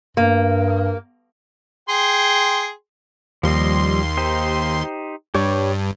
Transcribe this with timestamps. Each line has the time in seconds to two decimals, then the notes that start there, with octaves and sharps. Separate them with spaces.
0.17 G2 A#3
1.89 G#4 G5 C6
3.43 D#2 F3 G3 D#5 C6
4.17 D#4 G4 C5
5.35 G2 G4 C#5 C#6